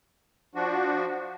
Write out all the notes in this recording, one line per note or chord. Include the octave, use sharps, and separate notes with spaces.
F3 D4 F#4